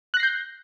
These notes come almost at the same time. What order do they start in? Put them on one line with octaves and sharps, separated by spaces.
F#6 A#6 C7 G6